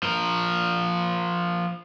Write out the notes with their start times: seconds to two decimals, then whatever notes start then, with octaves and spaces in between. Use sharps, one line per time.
0.03 F3 A#4